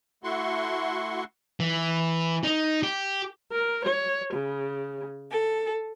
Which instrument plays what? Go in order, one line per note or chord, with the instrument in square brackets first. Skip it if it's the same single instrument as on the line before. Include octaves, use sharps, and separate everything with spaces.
[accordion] A3 E4 F#4 F#5 C6 C#6
[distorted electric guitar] E3
D#4
G4
[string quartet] A#4
C#5
C#3
A4